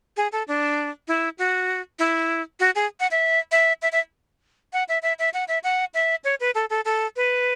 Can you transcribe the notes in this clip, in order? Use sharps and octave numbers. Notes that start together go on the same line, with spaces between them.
G#4
A4
D4
E4
F#4
E4
F#4
G#4
F#5
E5
E5
E5
E5
F#5
E5
E5
E5
F#5
E5
F#5
E5
C#5
B4
A4
A4
A4
B4